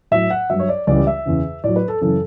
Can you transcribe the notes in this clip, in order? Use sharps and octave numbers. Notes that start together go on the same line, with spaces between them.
A2 F#3 E5
F#5
G2 F#3 E5
C#5
D5
C#2 C#3 E3 G3 D5
E5
E2 C#3 E3
A2 F#3 D5
B4
A4
F#2 C#3 E3 A4